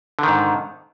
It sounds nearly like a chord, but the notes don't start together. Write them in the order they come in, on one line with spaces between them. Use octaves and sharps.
D3 D#3 G#2